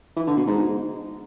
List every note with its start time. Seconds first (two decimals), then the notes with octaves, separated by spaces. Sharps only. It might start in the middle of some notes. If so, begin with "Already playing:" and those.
0.16 E3
0.27 D3
0.37 B2
0.47 G#2